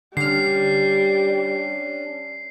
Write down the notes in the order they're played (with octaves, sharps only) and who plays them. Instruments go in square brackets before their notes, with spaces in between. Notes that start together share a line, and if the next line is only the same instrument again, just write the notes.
[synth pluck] D3 F6 [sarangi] G3 [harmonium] C#4 D4 [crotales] C7